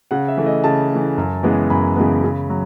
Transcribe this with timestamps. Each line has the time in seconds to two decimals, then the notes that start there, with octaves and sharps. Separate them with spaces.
0.11 C#3 F#5
0.28 E5
0.37 E3 A3
0.46 D#5
0.64 C#3 A5
0.90 A3
0.95 E3
1.18 F#2
1.43 C#3 E3 G#3 B3
1.70 F#2 B5
1.96 C#3 E3 G#3 B3
2.24 C#3
2.50 F#3